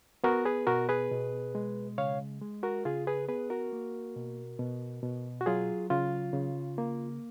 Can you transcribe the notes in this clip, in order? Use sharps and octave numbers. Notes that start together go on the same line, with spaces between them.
B3 F#4 A#4
G#4 B4
B2 F#4 A#4
G#4 B4
B2
G#3
C#3 C#5 F5
G#3
F#4 A#4
C#3 F4 G#4
G#4 B4
B3 G#4 B4
F#4 A#4
A#3
B2
B2
B2
F#4
F#3 F4 G#4
C#3 F4
C#3
A#3